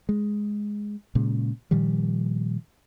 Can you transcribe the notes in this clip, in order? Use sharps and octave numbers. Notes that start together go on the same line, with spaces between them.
G#3
A#2 C#3 G#3
A#2 D#3 F3 G3